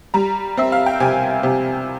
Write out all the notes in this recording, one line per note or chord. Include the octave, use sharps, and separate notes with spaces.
G3 A#5
C4 E5
F5
G5
C3 G#5
C3